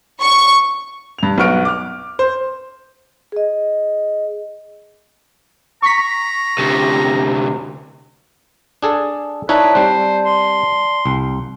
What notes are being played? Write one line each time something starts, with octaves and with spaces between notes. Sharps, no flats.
C#6
G2 F7
B1 B3 F#4 C#6 F6 D7
D6 F6
C5
G#4 D#5
A#5 C#6 B6
D2 C3
D4 G#4 A4
D#4 E4 B4 C#5 D5 A5
G3 C4 C5
C6
C2